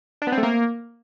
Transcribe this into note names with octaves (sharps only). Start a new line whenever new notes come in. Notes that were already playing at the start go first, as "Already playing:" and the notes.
D4
B3
C4
A3
A#3